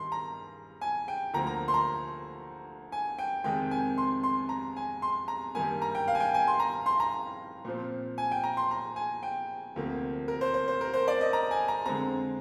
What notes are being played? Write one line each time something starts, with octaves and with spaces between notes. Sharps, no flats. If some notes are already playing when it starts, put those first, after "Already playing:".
Already playing: G2 D#3 C6
A#5
G#5
G5
D2 D3 F3 A#3 A#5
A#5
C6
A#5
G#5
G5
F2 C3 D#3 G#3 G5
G#5
C6
C6
A#5
G#5
C6
A#5
G2 D#3 G3 A#3 G#5
A#5
G5
F5
G#5
G5
G#5
C6
A#5
C6
A#5
A#2 F3 C4
G#5
G5
A#5
C6
A#5
G#5
G5
D2 C3 F3 A#3
A#4
C5
C5
C5
A#4
C5
D5
D#5
A#5
G#5
A#5
F2 D3 G#3 C4 A#5